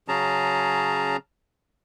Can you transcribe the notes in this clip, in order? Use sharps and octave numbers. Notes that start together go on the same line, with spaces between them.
C#3 F#3 C#4 G#4 A5 A#5